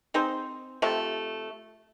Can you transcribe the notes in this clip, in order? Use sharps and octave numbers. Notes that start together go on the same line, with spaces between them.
C4 D#4 G#4 C5
C3 F3 A3